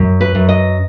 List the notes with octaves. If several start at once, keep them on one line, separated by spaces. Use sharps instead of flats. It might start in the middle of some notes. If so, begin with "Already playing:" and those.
Already playing: F#2
B4
F#2
D#5